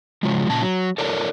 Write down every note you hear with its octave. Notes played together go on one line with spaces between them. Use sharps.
C#3 F3 F#3 G#3
A#2 C#3 A5
F#3
A4 A#4 C#5 D5